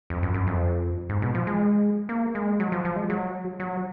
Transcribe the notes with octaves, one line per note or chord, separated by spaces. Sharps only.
F2
F#2
F#2
F2
G#2
B2
F3
G#3
A#3
G#3
F#3
F3
F3
G#3
F#3
F#3